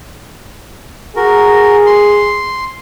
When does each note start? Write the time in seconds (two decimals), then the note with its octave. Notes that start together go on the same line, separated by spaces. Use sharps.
1.16 F#4 G#4 A#4
1.86 C6